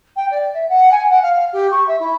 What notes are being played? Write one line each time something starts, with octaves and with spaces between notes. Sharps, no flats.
G5
D5
E5
F#5
G#5
F#5
F5
G4
C#6
E5
E4